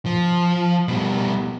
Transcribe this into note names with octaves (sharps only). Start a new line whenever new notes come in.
F3
B2 G3